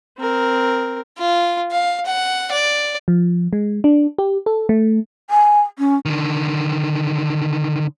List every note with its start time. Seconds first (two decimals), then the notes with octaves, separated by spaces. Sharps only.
0.18 C4 A#4
1.18 F4
1.72 F5
2.06 F#5
2.52 D5
3.08 F3
3.53 G#3
3.84 D4
4.18 G4
4.46 A4
4.69 A3
5.30 G#5
5.79 C#4
6.06 D3 D#3